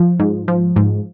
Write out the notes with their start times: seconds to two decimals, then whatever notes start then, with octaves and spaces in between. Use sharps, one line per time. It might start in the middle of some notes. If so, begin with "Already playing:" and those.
Already playing: F3
0.20 G#2
0.48 F3
0.76 G#2